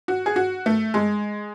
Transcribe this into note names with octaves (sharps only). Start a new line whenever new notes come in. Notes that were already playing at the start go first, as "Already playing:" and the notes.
F#4
G#4
F#4
A3
G#3